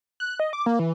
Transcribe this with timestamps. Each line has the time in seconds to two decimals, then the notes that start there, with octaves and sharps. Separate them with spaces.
0.20 F#6
0.40 D#5
0.53 D6
0.66 A#3
0.79 E3